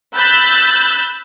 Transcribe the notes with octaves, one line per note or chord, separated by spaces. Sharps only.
B5 E6 F#6 G6 A6